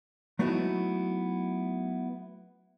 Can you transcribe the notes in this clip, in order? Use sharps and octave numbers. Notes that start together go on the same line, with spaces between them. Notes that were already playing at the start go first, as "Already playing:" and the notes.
F#3 A3 B3 D#4 E4 F#4